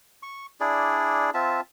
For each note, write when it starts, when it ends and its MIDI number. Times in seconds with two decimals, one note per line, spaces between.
0.23 0.46 85
0.61 1.30 62
0.61 1.30 64
0.61 1.30 68
0.61 1.30 74
1.34 1.61 60
1.34 1.61 65
1.34 1.61 76
1.34 1.61 81